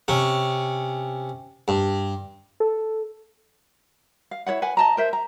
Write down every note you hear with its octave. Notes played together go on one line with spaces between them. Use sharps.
C3 C#4
G2
A4
F5
E4 C#5 D5 F#5
B4 F#5 G#5
D#5 A5 A#5
A#4 C5 E5
A#5